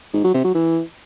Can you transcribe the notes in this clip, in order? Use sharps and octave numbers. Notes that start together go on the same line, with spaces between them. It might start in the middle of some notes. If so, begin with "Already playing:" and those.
G#2
F#3
C3
F#3
E3